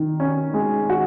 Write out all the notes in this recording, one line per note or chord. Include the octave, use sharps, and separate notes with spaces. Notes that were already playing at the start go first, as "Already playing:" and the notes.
Already playing: D#3
C#4
G#3
F#4